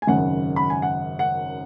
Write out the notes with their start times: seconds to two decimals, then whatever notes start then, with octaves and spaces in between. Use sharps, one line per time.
0.02 G#5
0.07 G#1 F#2 C#3 F#5
0.56 B5
0.70 G#5
0.82 F#5
1.19 F#5